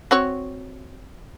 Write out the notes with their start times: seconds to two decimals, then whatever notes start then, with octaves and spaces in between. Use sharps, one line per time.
0.11 C4 F#4 C#5